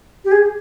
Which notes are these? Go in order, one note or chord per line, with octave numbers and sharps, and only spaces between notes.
G4
G#4